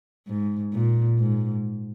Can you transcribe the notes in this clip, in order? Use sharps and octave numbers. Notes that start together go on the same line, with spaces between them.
G#2
A#2
G#2